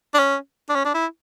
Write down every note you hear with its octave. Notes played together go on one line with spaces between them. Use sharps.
D4
C#4
D4
C#4
D4
E4